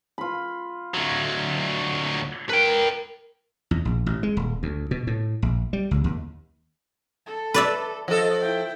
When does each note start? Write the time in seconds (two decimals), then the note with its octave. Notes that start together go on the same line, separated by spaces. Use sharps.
0.18 F4 B5
0.94 D2 F#3
2.49 A#4 B4 G5
3.71 E2
3.85 A#1
4.06 A1
4.23 G#3
4.37 D#1
4.63 D2
4.91 B2
5.07 A2
5.42 A#1
5.73 G3
5.91 C#2
6.04 D#2
7.26 A4
7.54 B4 D5 E5
8.08 F3 A4 D#5
8.40 E4 G5